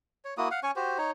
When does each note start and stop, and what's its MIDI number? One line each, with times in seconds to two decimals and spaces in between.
0.25 0.34 73
0.38 0.49 58
0.38 0.49 64
0.38 0.49 66
0.38 0.49 87
0.51 0.60 77
0.51 0.60 78
0.63 0.71 61
0.63 0.71 73
0.63 0.71 80
0.63 0.71 85
0.76 0.98 66
0.76 0.98 67
0.76 0.98 72
0.98 1.11 63
0.98 1.11 73